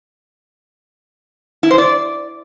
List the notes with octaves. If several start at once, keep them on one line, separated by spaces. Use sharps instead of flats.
E4
C5
D5